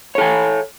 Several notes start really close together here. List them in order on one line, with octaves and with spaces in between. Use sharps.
C#5 A4 G#5